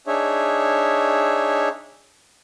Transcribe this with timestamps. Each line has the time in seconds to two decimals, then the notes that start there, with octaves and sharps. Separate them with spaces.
0.07 D4 D#4 G#4 C#5 E5